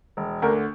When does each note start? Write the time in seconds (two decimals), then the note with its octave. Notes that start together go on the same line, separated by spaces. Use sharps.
0.17 E1
0.42 D2 D3 A#4